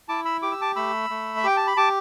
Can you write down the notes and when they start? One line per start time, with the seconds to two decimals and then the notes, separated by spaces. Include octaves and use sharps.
0.08 E4 A5 D6
0.25 B5 E6
0.42 G4 D6
0.52 E6
0.61 A5 D6
0.76 A3 B5 E6
1.10 A3
1.37 E5
1.44 G4 G5
1.57 A5
1.67 B5
1.77 G4 A5 D6